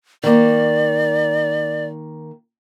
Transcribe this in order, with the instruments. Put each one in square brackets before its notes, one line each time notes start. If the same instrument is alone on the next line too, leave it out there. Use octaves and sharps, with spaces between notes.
[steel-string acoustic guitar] D#3 A#3 [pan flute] D5